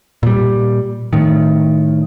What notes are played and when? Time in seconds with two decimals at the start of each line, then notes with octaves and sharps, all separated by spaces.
0.23 A#2 G3
1.13 A2 D#3